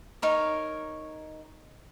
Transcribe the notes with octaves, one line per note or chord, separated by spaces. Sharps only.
D#4 A#4 C#5